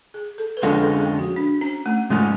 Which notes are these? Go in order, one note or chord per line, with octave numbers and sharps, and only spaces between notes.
G#4
A4
B4
F2 D3 G#3 C#4 F4 A4
A4
G#4
F#4
D4
C#4
A3
G#2 G#3 A3 C#4 F4